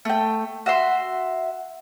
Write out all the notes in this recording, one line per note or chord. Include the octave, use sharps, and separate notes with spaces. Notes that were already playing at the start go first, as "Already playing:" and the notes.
A3 G5
F#4 E5 C6